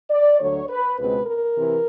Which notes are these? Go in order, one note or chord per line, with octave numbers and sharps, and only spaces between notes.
D5
D2 D3 F#3 A3 C#5
B4
C#2 B2 G#3 C4 B4
A#4
C3 E3